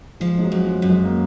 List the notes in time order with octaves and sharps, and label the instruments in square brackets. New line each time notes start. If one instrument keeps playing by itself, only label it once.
[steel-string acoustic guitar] F3 [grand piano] G#3
[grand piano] G#3
F#3
[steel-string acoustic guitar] F#2
[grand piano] G#3
[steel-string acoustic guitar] F#2
[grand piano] G#3
A#3